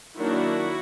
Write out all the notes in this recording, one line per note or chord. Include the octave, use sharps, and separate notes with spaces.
D#3 F#3 A#3 D4 E4 F#4